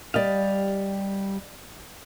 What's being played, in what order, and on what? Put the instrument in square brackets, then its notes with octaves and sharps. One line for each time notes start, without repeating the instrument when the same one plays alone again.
[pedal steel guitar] G3 G4 F5 [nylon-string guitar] D5 D#5